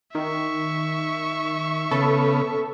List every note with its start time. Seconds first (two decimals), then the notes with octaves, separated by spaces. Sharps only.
0.15 D#3 E5 C#6
1.91 C#3 B3 A4